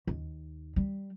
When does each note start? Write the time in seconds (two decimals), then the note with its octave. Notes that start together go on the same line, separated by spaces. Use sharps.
0.07 D#2
0.76 G3